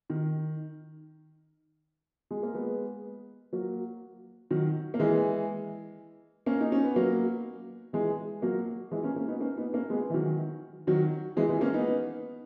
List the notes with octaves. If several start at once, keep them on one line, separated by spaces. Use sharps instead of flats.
D#3
G#3
A#3
G#3 B3
F#3 A#3
D#3 F#3
A#3
E3 G#3
A#3 C#4
D#4
C#4
B3
F#3 A#3
E3 G#3
F#3 A#3
E3 G#3
A#3 C#4
A#3 C#4
B3 D#4
A#3 C#4
B3 D#4
A#3 C#4
G#3 B3
E3
D#3 F#3
D#3 F#3
E3 G#3
E3 G#3
A#3 C#4
B3 D#4